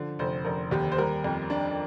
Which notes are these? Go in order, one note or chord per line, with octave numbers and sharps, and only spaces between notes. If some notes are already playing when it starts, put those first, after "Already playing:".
Already playing: D3 F3
F1 C5
F1 A#4
D#2 G4
C5
G3 A#4
F2
D4